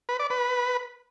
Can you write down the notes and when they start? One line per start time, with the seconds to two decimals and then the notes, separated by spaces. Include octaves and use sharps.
0.09 B4
0.19 D5
0.30 B4